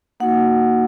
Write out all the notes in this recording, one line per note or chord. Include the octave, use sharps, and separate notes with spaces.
A#3 D#4 F#4 F#5